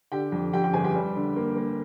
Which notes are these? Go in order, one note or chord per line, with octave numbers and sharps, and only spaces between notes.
D3 G4 G5
F2
F2 G4 G5
G4 G5
G1 G#4 G#5
G4 G5
G3
D3
A#3
A#3